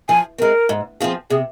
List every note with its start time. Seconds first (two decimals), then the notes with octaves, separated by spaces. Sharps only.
0.09 F3 G#5
0.38 G#3 C4 A#4
0.69 G#2
1.00 F3 C4 F4 G#4
1.30 C3 G#4